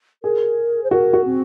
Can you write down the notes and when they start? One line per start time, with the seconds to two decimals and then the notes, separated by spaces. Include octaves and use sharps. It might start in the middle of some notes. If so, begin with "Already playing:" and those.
0.23 G#4 A#4
0.83 C5
0.91 F#4 A#4
1.13 F#4
1.25 C4